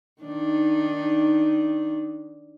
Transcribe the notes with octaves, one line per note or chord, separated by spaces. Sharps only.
D#3 D4 D#4